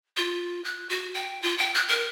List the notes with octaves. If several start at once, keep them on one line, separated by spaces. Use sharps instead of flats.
F4
F#6
F#4
G5
F4
G5
F#6
A#4